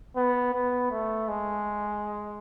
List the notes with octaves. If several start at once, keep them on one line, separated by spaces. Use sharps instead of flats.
B3
B3
A3
G#3